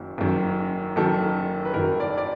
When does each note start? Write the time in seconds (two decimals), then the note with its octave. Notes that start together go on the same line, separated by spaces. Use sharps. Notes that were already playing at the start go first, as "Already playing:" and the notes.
Already playing: F#1 F#2 D#3
0.18 F#1 F#2 D#3 F#3
0.96 F#1 F#2 D#3 F#3 A4
1.65 B4
1.74 F#1 F#2 D#3 F#3 A#4
2.00 D5
2.18 D5